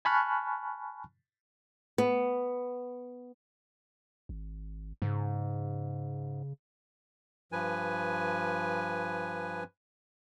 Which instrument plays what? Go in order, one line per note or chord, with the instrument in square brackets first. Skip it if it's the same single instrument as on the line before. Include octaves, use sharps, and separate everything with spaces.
[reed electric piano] G#5 A5 B5 C#6 F6 F#6
[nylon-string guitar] B3
[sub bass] G#1
[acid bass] G#2 [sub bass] C#3
[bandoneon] G2 F3 B4 G#5